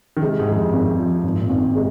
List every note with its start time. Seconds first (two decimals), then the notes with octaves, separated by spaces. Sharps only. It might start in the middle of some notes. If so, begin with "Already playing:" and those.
0.17 D#3
0.22 C3 G#3
0.39 G#2
0.48 F2 G#3
0.56 G#2
0.73 G#1
0.98 F3
1.24 G#1 G#2
1.41 A#2
1.49 G#1
1.57 D#3
1.75 C3 G#3